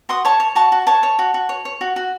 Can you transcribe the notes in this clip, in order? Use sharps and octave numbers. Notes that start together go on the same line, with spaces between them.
F#4 C6 D#6
C#5 A5 C#6
C#5
F#4 A5 C#6
F#4
C#5 A5 C#6
C#5
F#4
F#4
C#5
C#5
F#4
F#4